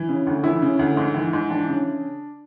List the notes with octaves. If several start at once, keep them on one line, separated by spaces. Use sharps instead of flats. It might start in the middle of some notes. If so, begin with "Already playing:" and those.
Already playing: E3
C#3
D2
E3 E4
C#3
D2
G#2
E3
G#2
E3 D4
C#3